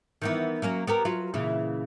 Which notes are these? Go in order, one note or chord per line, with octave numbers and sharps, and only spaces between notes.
D#3 E3 B3
F#3 A#3 C#4
B3 G4 A#4
F#3 F4 B4
A#2 C#3 E3